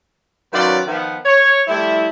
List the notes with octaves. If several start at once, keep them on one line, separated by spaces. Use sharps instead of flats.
D#3 F#3 C#4 F4 B4 D5
D#3 F3 B3
C#5
F3 G3 A3 E4